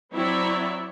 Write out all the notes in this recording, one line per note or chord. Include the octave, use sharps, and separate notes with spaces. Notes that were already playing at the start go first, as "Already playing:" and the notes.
F#3 C4 E4 C#5 D5 E5